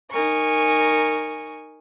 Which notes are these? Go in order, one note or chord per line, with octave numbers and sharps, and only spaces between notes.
D#4 A#4 G#5 C#6